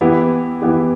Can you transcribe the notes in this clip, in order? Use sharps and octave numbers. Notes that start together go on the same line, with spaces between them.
E3 B3 E4 G4
E3 B3 E4 G4